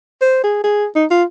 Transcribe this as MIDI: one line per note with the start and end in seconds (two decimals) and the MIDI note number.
0.22 0.44 72
0.44 0.60 68
0.64 0.87 68
0.96 1.05 63
1.11 1.24 65